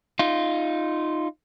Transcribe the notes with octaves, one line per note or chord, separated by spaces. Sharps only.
D#4 F4